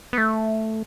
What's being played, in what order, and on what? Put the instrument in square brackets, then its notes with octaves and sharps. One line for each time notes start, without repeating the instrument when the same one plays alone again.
[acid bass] B3
A3